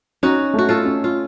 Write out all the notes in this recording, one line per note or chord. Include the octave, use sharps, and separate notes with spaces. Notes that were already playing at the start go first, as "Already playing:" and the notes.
C#4 D#4 F#4
A3 F#4
F4 A4
C#4
F4